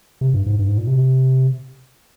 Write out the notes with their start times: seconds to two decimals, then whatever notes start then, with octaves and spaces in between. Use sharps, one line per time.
0.21 C3
0.34 G2
0.46 G#2
0.59 G2
0.68 G#2
0.78 A#2
0.87 C3